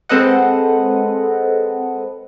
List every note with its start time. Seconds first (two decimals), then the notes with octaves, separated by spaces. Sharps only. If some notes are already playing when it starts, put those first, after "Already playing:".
0.09 G#3 C4 A4 B4 D#5 F#5